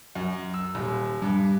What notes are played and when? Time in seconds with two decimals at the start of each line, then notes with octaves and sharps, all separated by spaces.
0.15 F#2
0.54 E6
0.75 D#1
1.22 G2